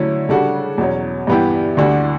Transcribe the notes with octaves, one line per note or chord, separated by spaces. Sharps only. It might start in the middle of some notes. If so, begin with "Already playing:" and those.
Already playing: D3 F#3 A3 C#4 E4
C#3 G3 D4 F#4 A4
E2 B2 F#3 C#4
G2 E3 B3 E4 G4
D2 D3 G3 D4 F#4